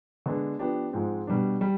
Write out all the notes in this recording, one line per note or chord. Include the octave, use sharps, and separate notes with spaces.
D3 G#3 B3 D4
F3 B3 D4 G4
G#2 F3 G#3 C4
B2 G3 D4
G3